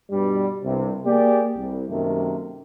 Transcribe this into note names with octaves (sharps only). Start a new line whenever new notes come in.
G2 B2 G3
C2 G2 C3
A#3 G4 G#4 D5
C2
F#2 C3 D#3 A3 A#3